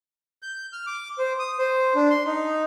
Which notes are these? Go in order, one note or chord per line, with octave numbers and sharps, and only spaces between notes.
G6
F6
D6
C5
D#6
C5
D4
C6
D#4